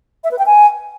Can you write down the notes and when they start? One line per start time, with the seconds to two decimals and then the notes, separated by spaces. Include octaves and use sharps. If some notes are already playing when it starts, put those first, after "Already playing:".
0.24 E5
0.31 B4
0.39 G5
0.46 G#5